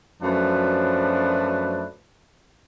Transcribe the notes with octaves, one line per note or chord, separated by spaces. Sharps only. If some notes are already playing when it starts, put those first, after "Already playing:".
F#2 F3 F#3 A3 D4 B4